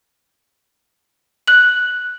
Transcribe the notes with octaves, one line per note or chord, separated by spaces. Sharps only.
F#6 F#7